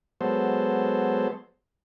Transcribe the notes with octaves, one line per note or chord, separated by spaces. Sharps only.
F#3 G#3 B3 A4 C5